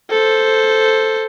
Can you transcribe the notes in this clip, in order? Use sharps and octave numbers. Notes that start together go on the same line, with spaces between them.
A4 C5